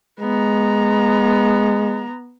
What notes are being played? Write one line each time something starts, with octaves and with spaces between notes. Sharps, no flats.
G#3 B3 A#5